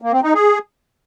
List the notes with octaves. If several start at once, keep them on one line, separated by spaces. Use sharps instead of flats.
A#3
C4
D#4
G#4